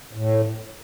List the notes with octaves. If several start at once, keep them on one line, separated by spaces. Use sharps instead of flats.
A2